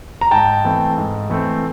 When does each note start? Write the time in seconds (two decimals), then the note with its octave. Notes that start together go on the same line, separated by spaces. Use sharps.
0.21 A#5
0.31 G#2 G5 A5
0.65 E3 A3 C4
0.97 G#2
1.30 E3 A3 C4